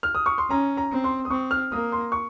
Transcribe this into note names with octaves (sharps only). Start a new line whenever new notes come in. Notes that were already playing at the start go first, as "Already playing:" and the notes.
F6
D#6
C#6
C6
C#4 A#5
A#5
C4
C6
D#6
C4 C#6
F6
A#3 D#6
C6
C#6